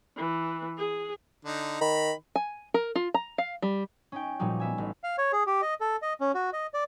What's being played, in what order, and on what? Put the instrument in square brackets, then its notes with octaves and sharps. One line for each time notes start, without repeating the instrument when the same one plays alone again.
[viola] E3
G#4
[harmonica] D3 D#4
[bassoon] D#3 [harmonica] A#5 B5
[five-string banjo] G#5
A#4
F4
A#5
F5
G3
[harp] C#4 D#4 G5
A#2 F3 G3 D#4 F#4
B3 E5 G#5
A1
[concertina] F5
C#5
G#4
G4
D#5
A4
D#5
C#4
F#4
D#5
D5